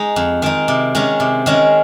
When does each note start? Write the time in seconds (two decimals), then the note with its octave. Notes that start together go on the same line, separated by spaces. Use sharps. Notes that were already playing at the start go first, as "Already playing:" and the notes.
Already playing: G#3 D#4
0.16 F2
0.42 D#3 G#3 D#4
0.68 C3
0.95 D#3 G#3 C#4
1.20 C3
1.46 D#3 G#3 C#4